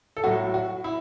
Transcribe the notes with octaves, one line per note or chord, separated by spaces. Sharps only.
A4
A2 F#3 F#4
F#4
E4